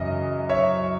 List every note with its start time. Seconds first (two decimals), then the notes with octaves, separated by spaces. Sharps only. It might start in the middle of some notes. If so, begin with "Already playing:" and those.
Already playing: F#2 C#3 E3 D#5
0.49 C#5 E5